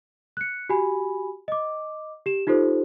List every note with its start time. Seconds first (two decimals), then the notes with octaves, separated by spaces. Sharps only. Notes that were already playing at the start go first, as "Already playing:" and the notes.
0.37 F#6 C#7
0.69 F#4 G4 G#5 B5
1.48 D#5 D6
2.26 G4 E7
2.47 D#4 F4 G4 A4 C5